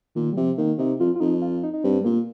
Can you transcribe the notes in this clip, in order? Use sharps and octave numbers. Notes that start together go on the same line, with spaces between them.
A#2 D#3
G3
C3 F3
D#3 A#3
C3 D#4
F2 F4
F4
F2 D#4
F4
D#4
D#4
G2 C4
G3
A#2 A#3